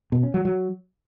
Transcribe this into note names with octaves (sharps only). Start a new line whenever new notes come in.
B2
C#4
F#3
F#3